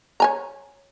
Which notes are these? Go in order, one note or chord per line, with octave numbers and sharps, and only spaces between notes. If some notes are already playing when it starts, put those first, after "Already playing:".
C#5 G#5 A#5